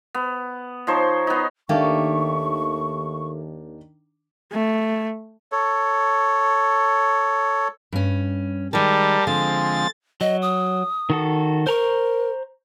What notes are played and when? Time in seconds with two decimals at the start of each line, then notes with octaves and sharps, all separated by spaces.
0.15 B3
0.87 F3 D#4 C5 C#5
1.27 B3 D#4
1.69 D#2 D#3 A3 A#3 D4 G4 C#6
4.52 A3
5.52 A4 C#5
7.92 G2 C#4
8.73 D#3 G3 G#3 A#4 A5
9.27 D3 F3 G#3 C4 A6
10.21 F#3 D#5
10.42 D#6
11.10 D#3 F#4 A4
11.67 A#4 C5 A#5 C#6